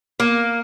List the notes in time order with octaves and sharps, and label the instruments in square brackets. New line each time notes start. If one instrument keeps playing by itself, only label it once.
[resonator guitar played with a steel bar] A#3